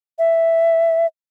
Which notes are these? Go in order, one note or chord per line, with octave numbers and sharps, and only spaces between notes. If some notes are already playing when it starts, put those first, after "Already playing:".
E5